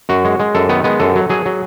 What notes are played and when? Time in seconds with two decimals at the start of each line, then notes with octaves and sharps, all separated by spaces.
0.09 F#2 F#4
0.25 G#3
0.40 G#3
0.55 F#2 A4
0.69 D#3 B3
0.84 G#3 B3
1.00 F#2 A4
1.16 F#3
1.30 F#3 G#4
1.46 F#3